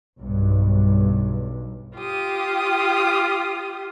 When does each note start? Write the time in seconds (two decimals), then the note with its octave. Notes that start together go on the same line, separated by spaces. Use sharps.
0.18 B1 G2
1.95 F4 G4 D#6